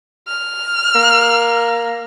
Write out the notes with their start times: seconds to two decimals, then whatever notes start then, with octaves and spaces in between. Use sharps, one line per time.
0.28 F6
0.95 A#3